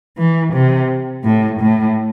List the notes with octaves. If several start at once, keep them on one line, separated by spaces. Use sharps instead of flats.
E3
C3
A2
A2